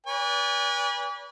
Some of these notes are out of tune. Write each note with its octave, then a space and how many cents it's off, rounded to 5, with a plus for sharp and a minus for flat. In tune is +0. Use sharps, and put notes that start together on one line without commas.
B4 -30 D5 -45 G#5 -35